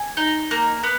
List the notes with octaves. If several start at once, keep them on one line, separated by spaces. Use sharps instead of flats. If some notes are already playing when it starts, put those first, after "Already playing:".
Already playing: G#5
D#4
A#3
B3